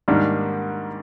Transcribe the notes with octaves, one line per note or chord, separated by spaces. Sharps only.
G#2 D#3 G3 A#3 D4